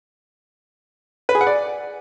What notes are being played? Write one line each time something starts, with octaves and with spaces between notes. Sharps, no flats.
B4
G#4
F#5
D5